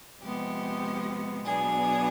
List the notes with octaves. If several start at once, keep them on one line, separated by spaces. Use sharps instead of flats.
C3 F3 G#3 B3 G4
B2 F#3 B3 D4 G#4